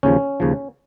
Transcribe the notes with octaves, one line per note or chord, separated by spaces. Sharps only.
D#2 C#3 F3 C#4
D#2 C#3 F3